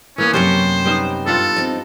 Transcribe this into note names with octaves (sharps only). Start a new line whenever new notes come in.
E3 A#3 B3 C#4
F#2 C3 C#4 D4 G4 C5 C#5
G3 B3 D#4
G2 F4 A4 F#5
C4 D#4